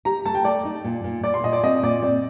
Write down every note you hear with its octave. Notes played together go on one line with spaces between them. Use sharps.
G4 A#5
A3 A5
G5
A3 D5
D#4
A#2
A#2
A#2 D5
C6
A#2 D#5
D5
C4 D#5
A#2 D5
C4 D5